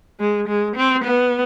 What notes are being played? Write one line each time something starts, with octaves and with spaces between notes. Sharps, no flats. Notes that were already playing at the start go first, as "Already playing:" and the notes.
G#3
G#3
C4
B3